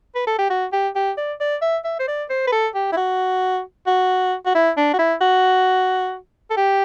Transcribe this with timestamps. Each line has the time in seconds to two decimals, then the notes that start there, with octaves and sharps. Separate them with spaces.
0.15 B4
0.27 A4
0.39 G4
0.50 F#4
0.73 G4
0.96 G4
1.18 D5
1.40 D5
1.62 E5
1.85 E5
1.99 C5
2.08 D5
2.30 C5
2.47 B4
2.52 A4
2.75 G4
2.92 E4
2.97 F#4
3.87 F#4
4.46 F#4
4.55 E4
4.77 D4
4.94 F#4
4.99 E4
5.21 F#4
6.51 A4
6.57 G4